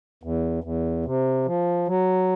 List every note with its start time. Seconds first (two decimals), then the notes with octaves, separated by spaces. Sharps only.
0.24 E2
0.64 E2
1.06 C3
1.46 F3
1.88 F#3